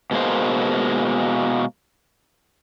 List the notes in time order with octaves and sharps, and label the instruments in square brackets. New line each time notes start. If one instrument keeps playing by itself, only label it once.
[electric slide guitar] B2 G#3 A#3 C5